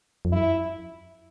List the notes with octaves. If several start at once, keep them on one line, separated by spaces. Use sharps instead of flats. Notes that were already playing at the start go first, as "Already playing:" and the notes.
F2
F#2 E4